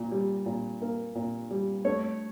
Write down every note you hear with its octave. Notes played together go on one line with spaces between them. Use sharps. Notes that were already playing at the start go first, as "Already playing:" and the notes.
Already playing: A#2
G3
A#2
A#3
A#2
G3
A3 C#5